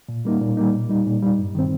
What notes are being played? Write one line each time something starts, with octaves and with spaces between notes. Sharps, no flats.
A#2
G3 A#3 D#4
A#2
G3 A#3 D#4
A#2
G3 D#4
A#2
G3 D#4
G2
D#3 C4